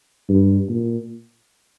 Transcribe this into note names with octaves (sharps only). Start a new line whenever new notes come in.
G2
A#2